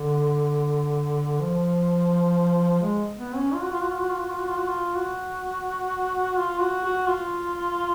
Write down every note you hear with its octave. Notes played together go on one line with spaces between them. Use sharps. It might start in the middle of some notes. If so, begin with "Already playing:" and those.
Already playing: D3
F3
G#3
B3
C#4
F4
F#4
F4
F#4
F4
F#4
F4
F#4
F4
F#4
F4
F#4
F4
F#4
F4
F#4
F#4
F4